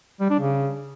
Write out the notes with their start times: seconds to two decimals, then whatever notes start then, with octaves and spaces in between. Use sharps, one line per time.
0.20 G3
0.30 D4
0.40 C#3